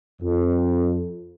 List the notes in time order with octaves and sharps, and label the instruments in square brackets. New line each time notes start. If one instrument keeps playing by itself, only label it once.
[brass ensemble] F2